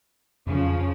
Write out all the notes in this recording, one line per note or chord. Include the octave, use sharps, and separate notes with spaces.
F2 C#3 F3